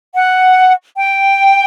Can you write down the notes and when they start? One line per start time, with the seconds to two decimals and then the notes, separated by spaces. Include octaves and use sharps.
0.15 F#5
0.97 G5